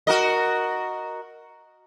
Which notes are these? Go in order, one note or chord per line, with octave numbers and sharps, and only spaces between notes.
F#4 A#4 D#5